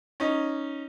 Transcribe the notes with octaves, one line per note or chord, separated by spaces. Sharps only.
C#4 D#4